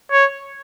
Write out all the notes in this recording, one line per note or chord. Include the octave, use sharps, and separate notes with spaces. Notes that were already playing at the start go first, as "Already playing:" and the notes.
C#5